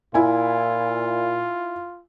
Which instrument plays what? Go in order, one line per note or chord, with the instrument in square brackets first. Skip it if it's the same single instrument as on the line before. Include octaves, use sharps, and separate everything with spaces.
[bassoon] A#2 [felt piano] E4 G#5 [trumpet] F4